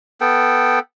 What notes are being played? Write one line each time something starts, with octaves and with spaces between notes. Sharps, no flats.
B3 A4 G5